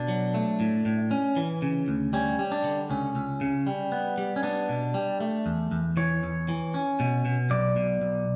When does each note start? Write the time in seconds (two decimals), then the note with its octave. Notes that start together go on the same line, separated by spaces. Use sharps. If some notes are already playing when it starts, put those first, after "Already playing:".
Already playing: B2 D4
0.08 F#3
0.34 A3
0.60 A2
0.85 A2
1.11 C#4
1.36 E3
1.62 C#3
1.88 D2
2.13 G3 C#4
2.39 G3
2.52 D4
2.64 D3
2.90 C#2 C#4
3.15 C#2
3.41 C#3
3.67 G3
3.92 B3
4.18 G3
4.36 C#4
4.43 B3 D4
4.69 B2
4.94 G3
5.20 A3
5.46 E2
5.71 E2
5.97 E3 C#5
6.23 E2
6.48 E3
6.74 C#4
7.00 B2
7.25 B2
7.50 B1 D5
7.76 B2
8.02 B1